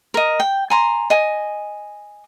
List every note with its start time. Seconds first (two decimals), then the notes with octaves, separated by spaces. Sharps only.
0.14 A#4 D#5
0.40 G5
0.70 G#5 A#5 C6
1.10 D#5 G#5